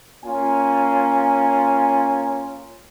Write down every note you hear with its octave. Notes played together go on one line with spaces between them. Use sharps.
A#3 C#4 F4 G#5